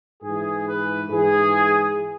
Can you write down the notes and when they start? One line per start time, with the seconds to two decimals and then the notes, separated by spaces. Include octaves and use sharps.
0.23 G#2 E3 G#4
0.67 B4
1.10 G#2 E3 G#4